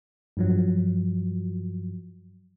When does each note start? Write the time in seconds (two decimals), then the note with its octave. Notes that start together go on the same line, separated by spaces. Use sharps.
0.37 G2 F3 F#3